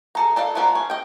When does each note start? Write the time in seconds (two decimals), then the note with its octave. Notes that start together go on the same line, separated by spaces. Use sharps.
0.15 G#4 A4 A#5
0.36 D4 A4 D#5 F5
0.55 F3 F#3 A#3 B3 D4
0.75 C#4
0.90 D#5 G5